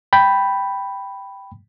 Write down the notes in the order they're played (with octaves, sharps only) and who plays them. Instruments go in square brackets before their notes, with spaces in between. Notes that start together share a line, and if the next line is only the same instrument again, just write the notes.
[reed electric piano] G5 B5